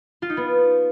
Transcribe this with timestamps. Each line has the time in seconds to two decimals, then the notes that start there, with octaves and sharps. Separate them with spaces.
0.22 F4
0.30 D#4
0.37 B3